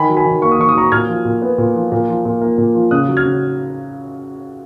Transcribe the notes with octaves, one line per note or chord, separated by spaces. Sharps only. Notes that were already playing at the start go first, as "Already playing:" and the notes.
Already playing: D#3 G#5 B5
F#3
G#5 B5
D#3
A#3 C#6
D#6
D#3 C#6
D#6
F#3 A#5 C#6
A#2 F6 G#6
F3
A#2
B3
A#2
F3
A#2
F3
A#2
A#3
A#2
F3
C#3 D#6 F#6
F#3
F6 G#6
C#3